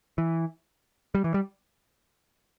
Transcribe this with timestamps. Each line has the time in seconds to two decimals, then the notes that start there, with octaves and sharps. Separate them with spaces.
0.18 E3
1.15 G3
1.24 E3
1.34 G3